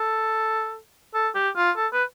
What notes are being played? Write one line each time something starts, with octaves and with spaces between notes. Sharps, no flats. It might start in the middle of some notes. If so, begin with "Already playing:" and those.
Already playing: A4
A4
G4
F4
A4
B4